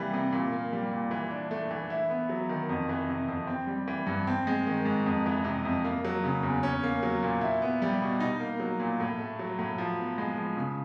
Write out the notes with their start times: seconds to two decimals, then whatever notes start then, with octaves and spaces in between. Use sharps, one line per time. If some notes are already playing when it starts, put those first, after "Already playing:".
Already playing: C3 E3 G3 A#3
0.14 C3
0.33 A#2
0.52 A#3
0.73 G3
0.91 A#2
1.11 E3
1.31 D4
1.51 A3
1.71 E3
1.90 E4
2.10 B3
2.29 F#3
2.49 D#3
2.69 F2
2.89 E3
3.09 C3
3.28 F2
3.47 C4
3.67 G3
3.88 E3
4.07 G2
4.27 C4
4.47 G#3
4.67 D#3
4.85 G#2
5.06 F2
5.26 E3
5.44 C3
5.65 F2
5.85 A#3
6.05 F#3
6.24 C#3
6.43 E2
6.63 C#4
6.83 A#3
7.03 F#3
7.23 A#2
7.41 E4
7.62 B3
7.82 G3
8.02 B2
8.20 D#4
8.40 A#3
8.60 F#3
8.80 A#2
9.00 A2
9.19 A3
9.39 F#3
9.59 A2
9.78 F3
9.98 B3
10.18 G#3
10.37 F3
10.57 C#3